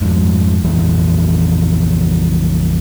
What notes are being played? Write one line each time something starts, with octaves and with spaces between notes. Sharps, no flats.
F2 G#2
A#1 F2 E3 F#3